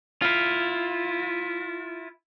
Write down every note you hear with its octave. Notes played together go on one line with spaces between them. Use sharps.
E4 F4